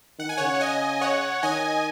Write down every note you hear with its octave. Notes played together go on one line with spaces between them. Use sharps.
D#3 F#5
G#5
C#3 C#5 F#5
D#5 G#5
C#5 F#5
D#3 D#5 G#5